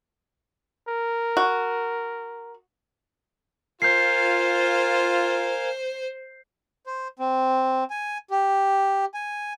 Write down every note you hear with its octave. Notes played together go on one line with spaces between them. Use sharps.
A#4
F#4
F4 A#4 C5 F5 G#5 G6 C7
C5
C4
G#5
G4
G#5